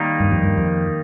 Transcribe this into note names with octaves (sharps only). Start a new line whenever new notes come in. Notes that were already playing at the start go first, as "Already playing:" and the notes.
Already playing: D#3 G3 A#3 D#4
G2
F2
G2
F2